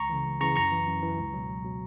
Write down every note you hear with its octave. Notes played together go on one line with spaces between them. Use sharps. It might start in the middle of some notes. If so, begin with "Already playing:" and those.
Already playing: C#2 A#5 C#6
C#3 E3
C#2
C#3 E3 A#5 C#6
F#2 A#5 C#6
E3
F#2
E3
C#2
B2 F#3
C#2
B2 F#3